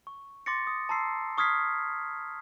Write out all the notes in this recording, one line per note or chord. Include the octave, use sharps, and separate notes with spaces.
C#6
C6 D6 A6 A#6 C#7
D#6
A5 A#5 C6 E6 C7
C#6 D#6 F6 G#6 B6 C7